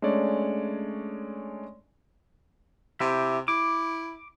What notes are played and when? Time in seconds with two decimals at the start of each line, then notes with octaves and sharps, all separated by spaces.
0.02 G#3 A3 C#4 D4 C#5 D5
3.00 C3 E4 G4
3.48 E4 D6